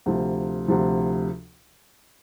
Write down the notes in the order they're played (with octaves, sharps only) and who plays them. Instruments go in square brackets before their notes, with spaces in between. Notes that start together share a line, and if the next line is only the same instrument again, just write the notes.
[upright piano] D2 C3 F3
D2 C3 F3